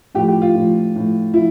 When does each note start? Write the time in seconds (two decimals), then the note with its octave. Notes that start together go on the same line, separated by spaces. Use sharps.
0.15 A2 F3 G4
0.28 G4
0.42 F4
0.55 A2 F3
0.95 A2 F3
1.34 F3 E4